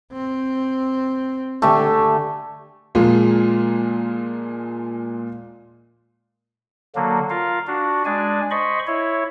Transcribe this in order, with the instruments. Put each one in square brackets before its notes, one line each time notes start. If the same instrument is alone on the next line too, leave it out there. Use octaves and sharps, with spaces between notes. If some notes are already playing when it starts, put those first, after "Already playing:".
[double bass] C4
[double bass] D3 [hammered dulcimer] A3 G4 G#5
[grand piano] A#2 F3 G#3 F4
[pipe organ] D3 F#3 A#3
F4 A#4 F5
D4 F#4
G#3 D4 D5 G#5
C5 D#5 B5 C#6
E4 C#5